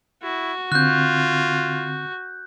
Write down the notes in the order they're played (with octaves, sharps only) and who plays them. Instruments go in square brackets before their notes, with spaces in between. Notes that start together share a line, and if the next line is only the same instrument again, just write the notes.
[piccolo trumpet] E4 [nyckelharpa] F#4
[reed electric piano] D3 C4 [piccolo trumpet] F4 [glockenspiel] F#6 G6